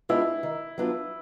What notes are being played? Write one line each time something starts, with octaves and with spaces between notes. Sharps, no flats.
G#3 B3 D4 E4 F4
D#3
F#3 B3 D4 F4